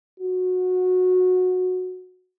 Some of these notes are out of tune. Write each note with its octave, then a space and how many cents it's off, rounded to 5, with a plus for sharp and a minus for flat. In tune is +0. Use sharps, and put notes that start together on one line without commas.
F#4 -15